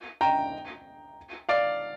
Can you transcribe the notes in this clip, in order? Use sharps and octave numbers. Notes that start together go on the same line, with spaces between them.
G5 A#5
D5 F5